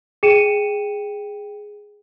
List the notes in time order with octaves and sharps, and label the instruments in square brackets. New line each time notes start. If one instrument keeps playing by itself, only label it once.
[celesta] G#4 G5 C#7 D#7 E7